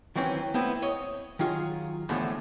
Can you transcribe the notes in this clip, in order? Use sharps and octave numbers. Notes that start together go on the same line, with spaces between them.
D#3 E3 F#3 C4 C#4
A3 B3 C4 E4
C#5 D#5
D#3 F#3 F4 G#4
E2 A2 D3 F3 G#3 A3